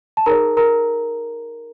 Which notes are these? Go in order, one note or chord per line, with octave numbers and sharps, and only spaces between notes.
A5
D#4 G#4 A#4 C#5 A#5
A#4 A#5